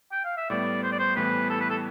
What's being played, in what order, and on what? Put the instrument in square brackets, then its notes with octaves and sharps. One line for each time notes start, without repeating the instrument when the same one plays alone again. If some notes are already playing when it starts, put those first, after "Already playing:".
[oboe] G5
F5
E5
[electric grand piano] A2 G3 B3 [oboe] D5
[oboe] C5
D5
C5
[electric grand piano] A2 E3 G3 B3 [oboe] B4
[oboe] A4
B4
A4